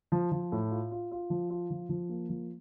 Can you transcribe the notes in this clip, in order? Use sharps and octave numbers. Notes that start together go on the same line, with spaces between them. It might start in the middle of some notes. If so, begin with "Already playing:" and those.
F3
F3
A2
F4
F4
F4
F3
F4
F3
F3
A#3
F3